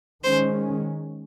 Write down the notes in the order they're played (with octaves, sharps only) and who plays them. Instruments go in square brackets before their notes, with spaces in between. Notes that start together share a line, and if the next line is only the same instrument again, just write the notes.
[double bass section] D#3 G#3 C#4 [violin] C5